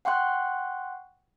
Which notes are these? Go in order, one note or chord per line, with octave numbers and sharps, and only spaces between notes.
F#5 G5 C6 C#6 F#6